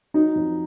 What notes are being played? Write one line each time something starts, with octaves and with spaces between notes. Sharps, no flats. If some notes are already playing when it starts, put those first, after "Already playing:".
F#3 D#4
F2